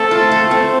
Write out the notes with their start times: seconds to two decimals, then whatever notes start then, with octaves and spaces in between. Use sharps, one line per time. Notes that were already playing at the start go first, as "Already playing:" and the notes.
Already playing: A3 C4 A4
0.11 F4
0.31 A3
0.51 C4